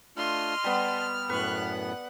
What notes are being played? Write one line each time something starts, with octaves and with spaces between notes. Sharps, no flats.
A3 D4 F4 D#5 C6 F6
G3 B3 A5
F#2 A2 B3 B4 C#6 F#6
F#5